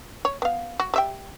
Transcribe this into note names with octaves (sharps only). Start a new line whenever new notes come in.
C#5
B3 F5
F#4
G3 E5 G5